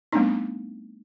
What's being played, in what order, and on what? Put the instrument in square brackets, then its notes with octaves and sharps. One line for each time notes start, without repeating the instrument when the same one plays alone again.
[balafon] G3 A3 B3 C4 D4 D#4